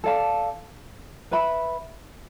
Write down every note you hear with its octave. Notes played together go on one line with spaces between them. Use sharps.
A4 D5 F5 A5
B4 E5 B5